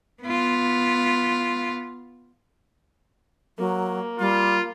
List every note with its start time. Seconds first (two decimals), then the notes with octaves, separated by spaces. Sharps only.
0.23 B3 F4
3.58 F#3 A#3
4.19 G3 F4